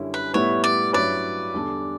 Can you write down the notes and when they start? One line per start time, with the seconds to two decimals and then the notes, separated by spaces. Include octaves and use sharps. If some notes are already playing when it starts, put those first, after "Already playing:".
Already playing: F#2 D3 G3 C#4 E4
0.14 B4
0.34 A2 G3 B3 E4 B4 C#5
0.64 D5
0.93 G2 F#3 C#4 E4 B4 D5
1.54 E2 D3 G3 D4 A4